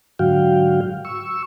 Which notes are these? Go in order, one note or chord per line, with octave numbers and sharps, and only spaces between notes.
G#2 D3 F#3 F#4 F5 G5
C#6 E6